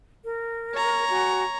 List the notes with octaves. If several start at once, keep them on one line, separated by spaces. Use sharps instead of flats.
A#4
C#5 A#5
F#4 G#5